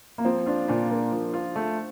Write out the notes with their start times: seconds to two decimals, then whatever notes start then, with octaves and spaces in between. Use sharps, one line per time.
0.18 A#3
0.25 F3 C4
0.46 D4 F4
0.68 A#2 D4
0.91 A#3
1.12 F3
1.33 F4
1.56 A3